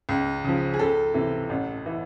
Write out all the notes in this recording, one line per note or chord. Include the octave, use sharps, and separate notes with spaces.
C#2
C#3 F3
G#4
C#2 A4
C3 E3
A1
E3